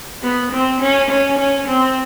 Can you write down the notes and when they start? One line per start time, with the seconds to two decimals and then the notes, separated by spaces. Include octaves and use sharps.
0.23 B3
0.52 C4
0.81 C#4
1.10 C#4
1.39 C#4
1.68 C4